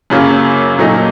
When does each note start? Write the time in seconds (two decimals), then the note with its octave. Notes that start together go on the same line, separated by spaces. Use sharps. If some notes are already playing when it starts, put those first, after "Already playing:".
0.10 F#2 C#3 F#3 A#3 C#4
0.79 A#2 F#3 A3 D#4